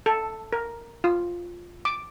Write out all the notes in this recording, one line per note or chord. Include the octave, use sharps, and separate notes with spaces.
A4
A#4
F4
D6